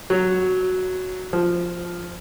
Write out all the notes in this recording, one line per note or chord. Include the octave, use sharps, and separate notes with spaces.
F#3
F3